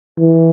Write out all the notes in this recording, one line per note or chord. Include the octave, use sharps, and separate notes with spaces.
E3